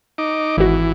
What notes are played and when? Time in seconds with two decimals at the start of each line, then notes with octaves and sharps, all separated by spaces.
0.18 D#4 D6
0.57 G#1 E3 F#4